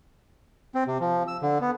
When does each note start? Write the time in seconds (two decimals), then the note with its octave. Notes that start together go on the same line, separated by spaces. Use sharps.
0.75 C4
0.87 C3
1.01 F3
1.28 E6
1.42 D3
1.61 B3